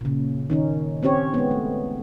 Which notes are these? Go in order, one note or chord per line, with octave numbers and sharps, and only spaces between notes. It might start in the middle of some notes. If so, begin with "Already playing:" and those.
A#2 C#3
D#3 C#4 D#4
C4 C#4 G4 C#5
G#3 B3
A3